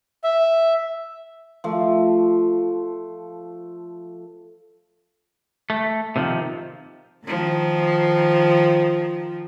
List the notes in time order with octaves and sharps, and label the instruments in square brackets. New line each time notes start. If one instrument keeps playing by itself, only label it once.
[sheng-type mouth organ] E5
[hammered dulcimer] F3 A3
[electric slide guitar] A3
C3 D#3 F3
[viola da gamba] D#3 F3